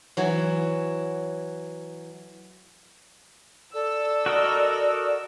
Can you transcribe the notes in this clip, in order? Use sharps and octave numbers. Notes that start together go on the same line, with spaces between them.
E3 F#3
A4 D5 E6
F#4 A#4 D#5